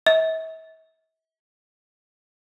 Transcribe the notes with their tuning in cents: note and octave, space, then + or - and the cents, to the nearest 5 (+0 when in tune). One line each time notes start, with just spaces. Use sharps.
E5 -40